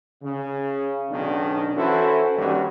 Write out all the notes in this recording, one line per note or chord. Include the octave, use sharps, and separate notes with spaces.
C#3
B1 B2 D#3 C#4 D4
E3 C#4 E4 F#4 A4 C5
G2 D#3 G3 A#3 C#4 F#4